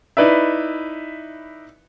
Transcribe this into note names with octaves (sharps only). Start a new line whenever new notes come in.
D#4 E4 B4 D5 E5